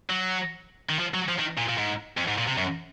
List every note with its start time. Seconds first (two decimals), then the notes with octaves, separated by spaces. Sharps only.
0.10 F#3
0.89 D#3
0.99 F3
1.14 F#3
1.29 F3
1.39 D#3
1.58 A#2
1.69 A#2
1.78 G#2
2.17 F2
2.28 G#2
2.38 A#2
2.47 C3
2.58 F#2